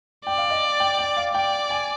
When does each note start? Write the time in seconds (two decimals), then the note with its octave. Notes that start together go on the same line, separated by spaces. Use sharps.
0.26 D5 G5
0.38 F5
0.50 D#5
0.80 G5
0.99 G5
1.17 F5
1.34 D5 G5
1.70 G#5